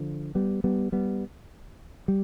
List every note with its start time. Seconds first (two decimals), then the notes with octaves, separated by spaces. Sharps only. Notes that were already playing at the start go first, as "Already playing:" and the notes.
Already playing: D3 F3
0.35 G3 B3
0.64 G3 B3
0.92 G3 B3
2.08 G3